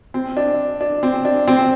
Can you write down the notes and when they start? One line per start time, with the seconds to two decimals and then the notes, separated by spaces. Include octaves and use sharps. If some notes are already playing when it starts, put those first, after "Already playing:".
0.14 C4
0.37 D4
0.81 D4
1.03 C4
1.25 D4
1.48 C4